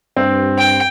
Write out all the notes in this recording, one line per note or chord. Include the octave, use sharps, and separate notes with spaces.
G2 C4
G5